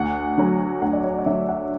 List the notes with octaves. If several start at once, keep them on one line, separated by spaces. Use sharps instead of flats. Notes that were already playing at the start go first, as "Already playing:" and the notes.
Already playing: D2 F#5
D3 F#3
D2 F#5
D5
C#5
D5
D3 F#3 E5
F#5